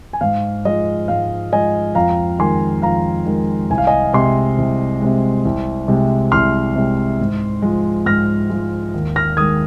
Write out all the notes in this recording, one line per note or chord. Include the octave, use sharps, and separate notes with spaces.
G#5
G#2 F5
F3 G#3 D#5
G#2 F5
F3 G#3 D#5 G#5
F2 F5 A#5
D#3 G#3 G#5 C6
F2 F5 A#5
D#3 G#3
C2 G#5
F5
D#5 G#5
C3 G#3 G#5 C6
C2
C3 G#3
C2
C3 G#3
C2 C6 F6
C3 G#3
G#2
F3 G#3
G#2 F6 A#6
F3 G#3
D#2
F6 A#6
D#3 G#3 D#6 G#6